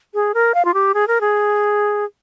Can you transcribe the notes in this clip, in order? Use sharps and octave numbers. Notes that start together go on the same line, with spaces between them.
G#4
A#4
F5
F4
G4
G#4
A#4
G#4